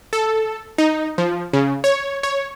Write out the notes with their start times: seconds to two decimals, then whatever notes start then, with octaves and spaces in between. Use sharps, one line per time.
0.13 A4
0.78 D#4
1.18 F3
1.53 C#3
1.84 C#5
2.23 C#5